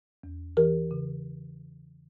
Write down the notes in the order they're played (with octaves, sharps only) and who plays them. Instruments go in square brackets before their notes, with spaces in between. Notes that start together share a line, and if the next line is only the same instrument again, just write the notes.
[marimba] E2
E3 G4 A#4
C#3